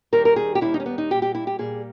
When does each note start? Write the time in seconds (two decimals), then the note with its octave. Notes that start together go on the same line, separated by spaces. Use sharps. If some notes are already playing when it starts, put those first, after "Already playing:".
0.12 D#2 D#3 G3 A#4
0.25 A#4
0.36 G#4
0.55 G4
0.61 D#2 D#3 G3 E4
0.74 D#4
0.80 C#4
0.86 B3
0.98 D#4
1.10 A#2 G3 G4
1.22 G4
1.35 E4
1.47 G4
1.59 A#2 G3 G#4